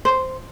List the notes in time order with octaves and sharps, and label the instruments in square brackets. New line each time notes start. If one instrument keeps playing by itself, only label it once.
[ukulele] C5